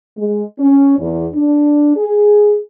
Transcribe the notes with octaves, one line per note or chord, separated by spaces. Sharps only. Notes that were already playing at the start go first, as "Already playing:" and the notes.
G#3
C#4
E2
D4
G#4